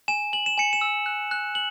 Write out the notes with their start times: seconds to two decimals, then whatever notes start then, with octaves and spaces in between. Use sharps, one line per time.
0.08 G#5 E7
0.33 G#5 F#7
0.46 E7
0.58 G#5 C#7
0.73 E7
0.81 E6
1.06 F#6
1.31 F#6
1.55 F#7